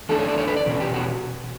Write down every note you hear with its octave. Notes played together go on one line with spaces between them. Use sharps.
E2 D3 A3 D4 A4
C#5
D5
C#5
B4
D5
E2 B2 C#4
G4
F#4